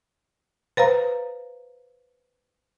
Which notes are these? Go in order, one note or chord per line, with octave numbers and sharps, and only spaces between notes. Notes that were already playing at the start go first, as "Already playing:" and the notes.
B4 C5 F5 A#5